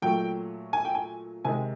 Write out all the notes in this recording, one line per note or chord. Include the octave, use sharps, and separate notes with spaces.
A#2 F#3 A3 G5
G#5
G5
G#5
C3 D#3 G#3 G#5